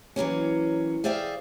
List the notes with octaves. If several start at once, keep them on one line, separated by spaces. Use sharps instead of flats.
E3 F#3 A#3 C#4
G#4 C5 D5 E5 F5 G5